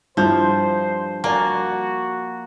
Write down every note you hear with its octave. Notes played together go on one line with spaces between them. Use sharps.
G2 F3 E4 F4 C5 G6
A#3 F#4 D5 G#5